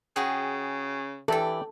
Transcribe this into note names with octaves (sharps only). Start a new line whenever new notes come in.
C#3 F#4 G#4 G5
E3 E4 G4 A4 D5 G5